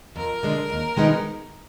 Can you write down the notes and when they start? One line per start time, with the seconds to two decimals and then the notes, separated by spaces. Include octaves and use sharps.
0.16 F2 A#4
0.43 D3 G#3 D4
0.70 D#2
0.97 D#3 G#3 B3 D#4